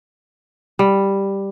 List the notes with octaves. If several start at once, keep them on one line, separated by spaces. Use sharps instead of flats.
G3